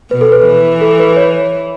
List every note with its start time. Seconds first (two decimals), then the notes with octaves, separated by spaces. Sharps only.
0.11 B2 B4
0.21 A4
0.32 B4
0.46 E3
0.81 A4
0.99 B4
1.16 C#5